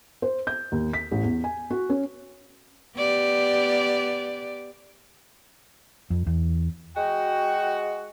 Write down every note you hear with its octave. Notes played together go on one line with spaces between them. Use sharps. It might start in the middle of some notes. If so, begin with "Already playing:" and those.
C5
G6
D#2
B6
A1
E2
G#5
F#4
C#4
B3 G4 D5
F2
E2
G#3 F#4 G5